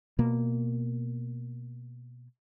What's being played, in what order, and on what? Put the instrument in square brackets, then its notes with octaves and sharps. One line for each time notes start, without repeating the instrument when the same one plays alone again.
[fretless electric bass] B2 A#3